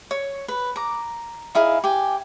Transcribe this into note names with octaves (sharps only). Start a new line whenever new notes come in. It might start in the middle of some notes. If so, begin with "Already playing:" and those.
C#5
B4
A#5 D6
D#4 E4 G#4 F5
G4 G#5